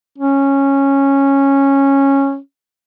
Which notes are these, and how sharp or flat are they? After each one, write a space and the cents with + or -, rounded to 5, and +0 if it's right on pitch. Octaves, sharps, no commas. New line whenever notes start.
C#4 -10